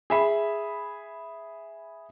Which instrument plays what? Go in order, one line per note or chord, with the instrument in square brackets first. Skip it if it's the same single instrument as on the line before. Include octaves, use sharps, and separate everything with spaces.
[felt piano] G#4 E5 B5